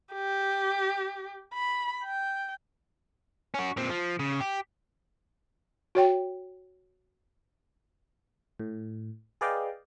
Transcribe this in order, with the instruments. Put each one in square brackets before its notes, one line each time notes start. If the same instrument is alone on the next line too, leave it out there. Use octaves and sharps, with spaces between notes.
[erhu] G4
B5
G5
[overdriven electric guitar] C#4 F#4
A#2 C4
F3
C#3
G4
[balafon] F#4 C#5 G5
[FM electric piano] A2
G#4 B4 D5 D#5 F5 G5